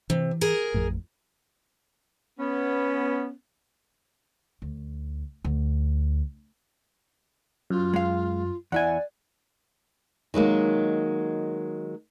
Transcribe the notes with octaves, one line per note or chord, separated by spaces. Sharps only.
C3 E3
G#4 A#4
A1 F2 A2
B3 C#4
D2
D2
F#2 F4
G#3 F5
E2 E4 D5 E5 F#5 G#5
D#3 F#3 G#3 A#3